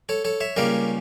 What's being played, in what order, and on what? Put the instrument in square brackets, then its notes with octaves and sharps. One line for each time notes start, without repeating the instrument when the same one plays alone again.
[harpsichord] A4 C#5
A4 C#5
C#5 E5
C#2 C#3 G3 A#3 C#4 A#4 D5